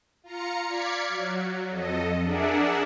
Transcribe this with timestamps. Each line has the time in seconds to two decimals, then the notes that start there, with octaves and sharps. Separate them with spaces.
0.23 F4 A#5 C#7
0.66 D5 F5 G#6 B6 C#7
1.09 F#3
1.70 F2 A4 D#5
2.23 D4 G#4 A#4 D5 E5 F#5